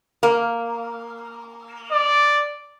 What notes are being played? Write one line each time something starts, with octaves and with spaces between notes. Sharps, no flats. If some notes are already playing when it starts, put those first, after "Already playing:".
A#3
D5